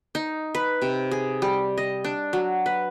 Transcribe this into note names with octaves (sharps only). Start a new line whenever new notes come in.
D#4
B4
C3
G#4
G3
D#5
D4
F#3
B4